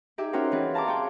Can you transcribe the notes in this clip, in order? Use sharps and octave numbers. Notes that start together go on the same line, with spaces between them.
D#4 G4 G#4 E5
C#4 D#4 F#4 A#4 C5 G5
E3 C4 G#4 B4
F5 A5 A#5 C6 D6
G#4 C#5 G5